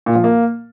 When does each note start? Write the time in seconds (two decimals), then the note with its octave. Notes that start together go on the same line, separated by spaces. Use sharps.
0.06 A#2
0.15 F3
0.24 A#3